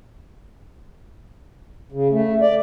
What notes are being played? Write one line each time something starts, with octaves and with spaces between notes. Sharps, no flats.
C#3
A3
D5